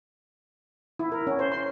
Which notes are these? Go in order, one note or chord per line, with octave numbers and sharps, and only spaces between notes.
E4
A#4
C#4
C5
C6